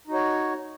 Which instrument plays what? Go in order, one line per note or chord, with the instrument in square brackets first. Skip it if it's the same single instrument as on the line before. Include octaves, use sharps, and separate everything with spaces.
[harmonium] D#4
F#4
C#5